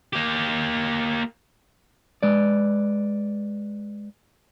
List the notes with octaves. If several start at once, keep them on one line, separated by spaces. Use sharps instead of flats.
A#3 G4
G#3 B4 D5